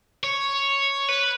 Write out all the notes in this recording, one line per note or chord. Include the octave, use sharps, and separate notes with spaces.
C#5
B4